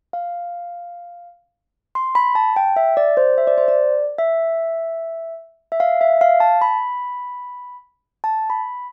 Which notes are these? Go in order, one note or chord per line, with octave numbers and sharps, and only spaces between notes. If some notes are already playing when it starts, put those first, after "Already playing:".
F5
C6
B5
A5
G5
E5
D5
C5
E5
D5
C5
D5
E5
E5
F5
E5
F5
A5
B5
A5
B5